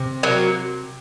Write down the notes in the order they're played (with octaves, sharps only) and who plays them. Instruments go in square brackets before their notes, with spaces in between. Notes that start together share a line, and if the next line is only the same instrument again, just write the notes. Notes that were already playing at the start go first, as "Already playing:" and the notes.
Already playing: [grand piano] C3
[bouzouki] F#3 A#3